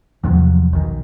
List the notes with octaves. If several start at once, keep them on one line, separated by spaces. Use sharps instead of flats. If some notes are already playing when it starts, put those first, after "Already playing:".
E2 C3 F3 F#3
B1 D#3